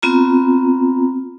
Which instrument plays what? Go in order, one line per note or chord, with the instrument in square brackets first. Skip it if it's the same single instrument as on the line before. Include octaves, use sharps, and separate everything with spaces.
[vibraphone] B3 C4 F4 A#5